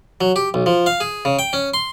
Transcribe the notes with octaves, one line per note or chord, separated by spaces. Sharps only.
F#3
G4
B1
F3
F5
G#4
C#3
G5
C#4
C6